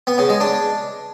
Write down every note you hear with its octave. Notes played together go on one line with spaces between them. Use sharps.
B3
C#3
G#3
D4